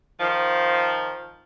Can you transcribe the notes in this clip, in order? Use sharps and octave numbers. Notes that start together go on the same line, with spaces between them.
D#3 F3